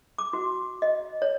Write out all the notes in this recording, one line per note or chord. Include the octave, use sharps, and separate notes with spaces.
D6
F#4
D#5
C#5